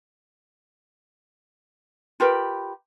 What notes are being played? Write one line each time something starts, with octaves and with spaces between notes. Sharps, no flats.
F4 G4 A#4 B4